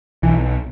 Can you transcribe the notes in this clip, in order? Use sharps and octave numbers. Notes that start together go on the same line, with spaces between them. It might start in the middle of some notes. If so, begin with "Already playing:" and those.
B1 E3